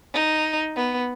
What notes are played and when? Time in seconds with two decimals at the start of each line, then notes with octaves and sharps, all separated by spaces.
0.14 D#4
0.76 B3